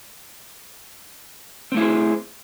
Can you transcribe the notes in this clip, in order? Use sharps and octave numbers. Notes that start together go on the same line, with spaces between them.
A3 C4 E4 G#4 C5